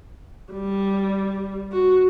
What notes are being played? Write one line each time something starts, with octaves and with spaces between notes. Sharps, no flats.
G3
F#4